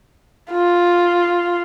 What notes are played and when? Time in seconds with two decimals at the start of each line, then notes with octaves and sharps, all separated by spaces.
0.51 F4